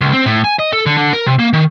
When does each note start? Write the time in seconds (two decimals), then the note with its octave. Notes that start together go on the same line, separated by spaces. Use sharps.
0.01 C#2
0.13 C4
0.26 A2
0.44 G#5
0.59 D#5
0.73 A4
0.86 D3
0.97 D3
1.13 A#4
1.26 C3
1.39 A#3
1.53 D#3